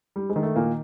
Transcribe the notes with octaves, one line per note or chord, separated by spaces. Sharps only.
G3
G#3
D#3
A3
A#2 A#3